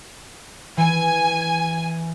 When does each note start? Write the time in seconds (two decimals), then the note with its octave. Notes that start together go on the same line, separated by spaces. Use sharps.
0.77 E3 G#5